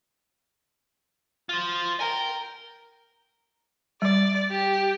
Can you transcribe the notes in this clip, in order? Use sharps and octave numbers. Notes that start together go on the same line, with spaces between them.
F4 C5
A#4 G5 G#5
G3 D5
G4